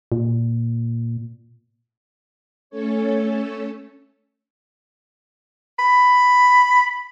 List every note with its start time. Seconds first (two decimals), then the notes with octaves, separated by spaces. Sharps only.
0.12 A#2
2.70 A3 C#4 A4 C#5
5.79 B5